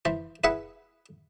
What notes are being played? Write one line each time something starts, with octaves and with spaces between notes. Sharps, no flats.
E3 C5
E4 G#4 B4 E5 F#5